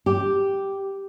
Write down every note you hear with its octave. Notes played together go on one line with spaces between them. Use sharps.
G4